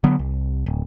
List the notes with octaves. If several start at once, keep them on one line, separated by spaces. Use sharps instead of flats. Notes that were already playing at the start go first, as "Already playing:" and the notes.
D3 F#3 B3
C2
D1